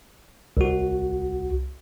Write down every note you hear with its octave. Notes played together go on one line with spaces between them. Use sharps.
C2 F#4